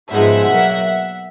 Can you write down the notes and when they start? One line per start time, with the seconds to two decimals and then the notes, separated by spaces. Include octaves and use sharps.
0.11 G#2 F3 G#3 B3 D#4 E5 F#5
0.46 B2 F#3 A#3